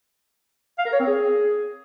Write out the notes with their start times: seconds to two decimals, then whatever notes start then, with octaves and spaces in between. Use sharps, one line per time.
0.79 F5
0.86 A#4
0.93 C#5
1.00 C4
1.07 G#4